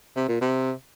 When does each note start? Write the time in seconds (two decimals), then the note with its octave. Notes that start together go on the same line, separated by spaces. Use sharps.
0.16 C3
0.28 A#2
0.41 C3